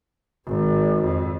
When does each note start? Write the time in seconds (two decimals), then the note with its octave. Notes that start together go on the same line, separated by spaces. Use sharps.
0.46 G#1
1.05 F2